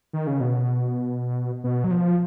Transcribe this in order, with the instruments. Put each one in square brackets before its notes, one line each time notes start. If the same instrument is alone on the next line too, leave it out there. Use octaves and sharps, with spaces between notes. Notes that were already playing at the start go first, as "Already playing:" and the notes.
[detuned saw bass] D#3
C#3
B2
B2
F#3
F3